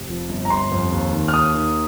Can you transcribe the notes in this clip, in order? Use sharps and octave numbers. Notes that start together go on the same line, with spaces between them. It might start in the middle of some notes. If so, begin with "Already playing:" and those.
Already playing: F1
F3
G1
A#5
G1 C6
F2
D#2
D#3
F6
D#2 D#6
D#3